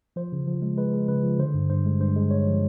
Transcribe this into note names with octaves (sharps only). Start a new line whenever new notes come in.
F3 C5
C#3
F3
G#3
G#3 B4
G#3
C#3 B4
F3
D3 C5
G2
G2 C5
G#3
G2 C5
G#3
G#3 C#5
F3